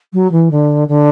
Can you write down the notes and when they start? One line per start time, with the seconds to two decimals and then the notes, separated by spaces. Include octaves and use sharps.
0.13 F#3
0.31 E3
0.50 D3
0.88 D3